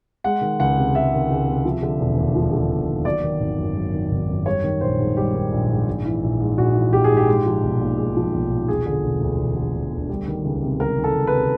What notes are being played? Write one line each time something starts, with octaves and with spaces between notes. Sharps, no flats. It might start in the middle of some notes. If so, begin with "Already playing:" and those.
G#3 F#5
D#3
C#2 F#5
C3
G#3 E5
D#3
C#2
C3
F3
D3
E1
D#2
F3
D3
E1
D#2
F#3 D5
D#3
G#1
F#2
F#3
D#3
G#1
F#2
G3 C#5
D#3
A#1 C5
G#2
G3 G4
D#3
A#1
G#2
A#1
E3
A#1
G#2
A#1 F#4
E3
A#1 G4
G#4
G#2
G4
G#3
F3
B1
A#2
G#3
F3
B1
A#2
E1 G#4
D3
E1
D2
E1
D3
E1
D2
G3
D#3
C#2
C3
G3 A#4
D#3
A4
C#2
B4
C3